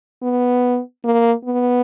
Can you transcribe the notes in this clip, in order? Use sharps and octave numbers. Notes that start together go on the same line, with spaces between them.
B3
A#3
B3